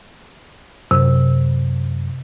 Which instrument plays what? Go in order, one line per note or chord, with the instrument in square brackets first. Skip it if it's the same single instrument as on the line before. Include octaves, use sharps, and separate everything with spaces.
[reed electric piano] F#2 [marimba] C3